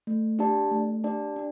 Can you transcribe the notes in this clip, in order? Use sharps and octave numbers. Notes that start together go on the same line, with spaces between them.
A3
D4 G4 D5 A5
A3
D4 G4 D5 A5
D4